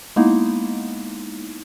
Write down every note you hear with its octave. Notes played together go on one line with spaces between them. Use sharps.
G#3 A#3 B3 D#4 E4